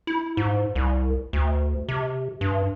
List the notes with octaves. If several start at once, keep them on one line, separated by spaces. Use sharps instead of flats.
E4
G#2
C2
D2
C3
G2